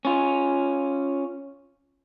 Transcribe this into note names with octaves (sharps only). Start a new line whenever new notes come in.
C#4 F4